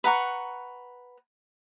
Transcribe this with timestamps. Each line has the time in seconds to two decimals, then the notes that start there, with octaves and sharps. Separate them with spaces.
0.04 B4 F#5 A#5 C#6